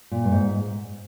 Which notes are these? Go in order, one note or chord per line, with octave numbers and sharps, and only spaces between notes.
A#2
G2
G#2